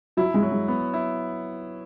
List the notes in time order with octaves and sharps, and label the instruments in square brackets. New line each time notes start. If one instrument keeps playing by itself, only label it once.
[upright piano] F#3 [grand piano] E4
[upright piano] G#3
[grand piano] F#3
[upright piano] G#3
[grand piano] B3
E4